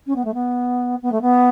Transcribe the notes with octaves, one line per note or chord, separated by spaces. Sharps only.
C#4
B3
A3
B3
B3
A3
B3